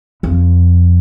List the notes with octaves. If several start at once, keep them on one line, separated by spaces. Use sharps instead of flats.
F2